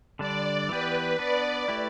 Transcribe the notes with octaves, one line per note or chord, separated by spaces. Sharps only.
D3 G3 D4 D5
E3 B3 G4 B4
B3 D4 B4 D5
A3 E4 G4 B4